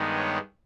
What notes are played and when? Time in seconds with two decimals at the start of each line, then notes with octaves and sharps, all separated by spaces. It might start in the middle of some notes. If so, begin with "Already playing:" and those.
Already playing: G2 D#3 G#3 B3 D#4
0.16 C#5